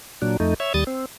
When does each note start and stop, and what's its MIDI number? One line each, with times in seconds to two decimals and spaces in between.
0.22 0.37 46
0.22 0.37 54
0.22 0.37 62
0.40 0.54 41
0.40 0.54 57
0.40 0.54 63
0.60 0.73 73
0.60 0.73 76
0.74 0.84 39
0.74 0.84 55
0.74 0.84 87
0.74 0.84 93
0.87 1.06 60